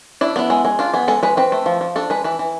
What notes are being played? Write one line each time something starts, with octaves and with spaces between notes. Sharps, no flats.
D4 E4
B3 E4
G#3
G#3
D4 F4
B3 G#4
G#3 A4
G#3 B4
C4 B4
A3
F3
F3
D4 A4
G#3 B4
E3 B4
E3